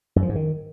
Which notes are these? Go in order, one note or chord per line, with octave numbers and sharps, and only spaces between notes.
F#2
F3
G#2
D#3